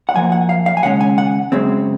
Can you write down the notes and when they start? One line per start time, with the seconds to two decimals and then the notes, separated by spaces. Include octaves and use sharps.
0.09 F#5
0.15 F#2 F3 A#3 G#5
0.32 F#5
0.49 F5
0.66 F5
0.77 G#5
0.83 D#2 C#3 G#3 C#4 F#5
1.01 G#5
1.18 F#5
1.52 F#2 C#3 G#3 C4